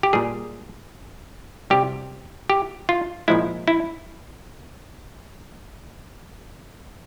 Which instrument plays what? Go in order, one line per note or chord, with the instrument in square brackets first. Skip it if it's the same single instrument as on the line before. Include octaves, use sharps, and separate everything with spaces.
[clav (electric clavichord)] G4
A#2 G3 G#4
C3 G3 G4
G4
F4
A#2 F3 G#3 E4
E4